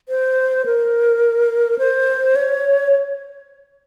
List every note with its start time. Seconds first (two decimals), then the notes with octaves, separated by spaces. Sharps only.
0.09 C5
0.66 A#4
1.79 C5
2.36 C#5